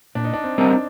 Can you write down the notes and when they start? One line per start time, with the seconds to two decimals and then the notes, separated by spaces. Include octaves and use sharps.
0.15 A#2 D4
0.24 D#4
0.34 D4
0.44 C4
0.58 G3 C4 D#4 A#4
0.72 D4